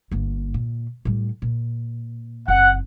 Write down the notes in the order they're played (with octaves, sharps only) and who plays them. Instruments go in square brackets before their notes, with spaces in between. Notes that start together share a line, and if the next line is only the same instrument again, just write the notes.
[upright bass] G1 A#3
A#2
A2 G3
A#2
[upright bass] F#1 C4 [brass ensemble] F#5